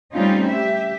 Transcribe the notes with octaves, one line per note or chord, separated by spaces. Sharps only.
G3 A3 C4 C#4 D#4 F4
G4 E5